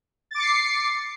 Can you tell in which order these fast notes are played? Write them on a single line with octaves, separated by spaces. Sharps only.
A6 D6 C#7 C7